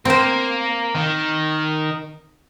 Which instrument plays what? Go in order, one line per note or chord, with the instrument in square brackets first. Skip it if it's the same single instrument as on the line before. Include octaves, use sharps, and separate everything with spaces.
[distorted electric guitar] A#3 [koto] C4 C5
[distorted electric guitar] D#3